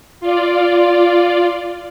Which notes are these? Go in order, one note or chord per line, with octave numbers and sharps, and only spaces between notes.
F4 D5